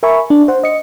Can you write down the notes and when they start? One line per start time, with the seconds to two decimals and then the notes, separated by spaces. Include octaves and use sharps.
0.03 A#4 E5 G#5 B5 C#6
0.30 D4
0.48 C5 F#5
0.63 D#5 C#7